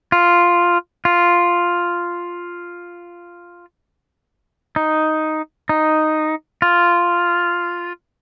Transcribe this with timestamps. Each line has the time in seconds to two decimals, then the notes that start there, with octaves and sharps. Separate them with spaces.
0.12 F4
1.05 F4
4.76 D#4
5.69 D#4
6.62 F4